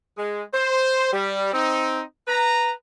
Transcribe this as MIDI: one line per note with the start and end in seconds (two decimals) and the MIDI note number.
0.18 0.43 56
0.54 1.10 72
1.12 1.52 55
1.53 2.02 60
1.53 2.02 63
2.27 2.72 71
2.27 2.72 82